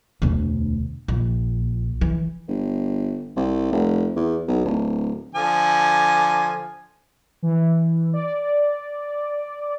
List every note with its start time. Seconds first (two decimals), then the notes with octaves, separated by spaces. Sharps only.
0.22 E1 D2
1.08 A#1
2.01 E3
2.48 G1
3.36 C2
3.72 F1
4.16 E2
4.48 B1
4.65 D1
5.35 D3 F3 G#5
7.42 E3
8.13 D5